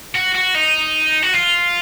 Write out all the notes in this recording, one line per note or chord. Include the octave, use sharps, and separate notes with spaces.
F#4
F#4
D#4
F#4
F4